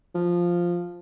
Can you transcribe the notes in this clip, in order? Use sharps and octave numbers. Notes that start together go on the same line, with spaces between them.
F3